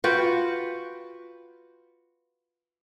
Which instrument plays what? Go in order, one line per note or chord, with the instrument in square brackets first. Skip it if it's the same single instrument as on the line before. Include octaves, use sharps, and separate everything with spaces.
[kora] F4 F#4 B4 G5